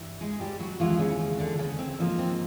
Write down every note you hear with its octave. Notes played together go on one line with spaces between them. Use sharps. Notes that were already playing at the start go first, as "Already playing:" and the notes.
Already playing: G2 E3
G#3 G#4
G3 G4
F#3 F#4
D#2 C#3 E3 F3 G#3 B3 F4
C#3 C#4
D3 D4
C#3 C#4
C4
G#2 F3 A#3
C4